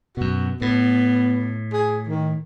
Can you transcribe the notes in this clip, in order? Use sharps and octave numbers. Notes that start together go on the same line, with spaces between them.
F#2 B2 F#4
A2 B3
G#4
D#3